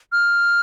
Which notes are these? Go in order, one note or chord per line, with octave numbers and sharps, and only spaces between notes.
F6